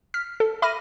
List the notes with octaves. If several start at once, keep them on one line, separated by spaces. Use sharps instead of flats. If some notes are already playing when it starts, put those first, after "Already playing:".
F6 B6
A4
E5 B5 D6 F6 A#6 D#7